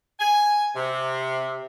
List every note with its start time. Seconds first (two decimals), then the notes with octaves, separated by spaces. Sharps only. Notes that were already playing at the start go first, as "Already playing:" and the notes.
0.19 G#5
0.75 C3